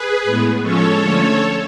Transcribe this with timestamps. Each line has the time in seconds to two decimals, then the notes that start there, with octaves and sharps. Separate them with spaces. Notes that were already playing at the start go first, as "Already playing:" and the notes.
Already playing: G#4 B4
0.24 A2 G#3 B3
0.62 F3 G#3 C#4 A4 C#5
1.00 D3 F3 A3 C#4